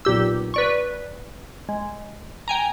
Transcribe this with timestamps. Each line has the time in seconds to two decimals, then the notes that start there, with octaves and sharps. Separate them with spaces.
0.05 B1 A#2 G4 E6
0.54 B4 D5 C#6
1.69 G#3
2.48 G5 G#5 A#5